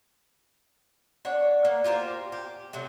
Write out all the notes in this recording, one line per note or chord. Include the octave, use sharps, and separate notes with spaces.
D4 C#5 F#5
A#3
F4 G4 A#4 C5
G4
C3 F#3 A3